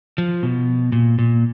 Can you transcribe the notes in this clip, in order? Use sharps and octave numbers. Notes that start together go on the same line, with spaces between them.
F3
B2
A#2
A#2